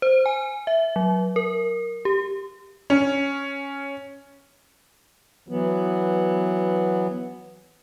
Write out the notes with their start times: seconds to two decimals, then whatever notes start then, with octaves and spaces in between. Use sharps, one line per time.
0.02 C5
0.26 G#5
0.67 E5
0.96 F#3
1.36 A#4
2.05 G4
2.90 C#4
5.48 E3 F#3 B3